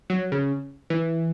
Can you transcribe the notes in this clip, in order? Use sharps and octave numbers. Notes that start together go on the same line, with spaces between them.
F#3
C#3
E3